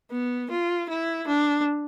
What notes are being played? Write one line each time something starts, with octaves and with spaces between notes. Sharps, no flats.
B3
F4
E4
D4